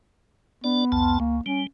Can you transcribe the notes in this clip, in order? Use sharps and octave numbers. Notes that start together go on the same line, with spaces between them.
B3 D4 D5
C2 F2 A5
C#2 A#3
G3 C#4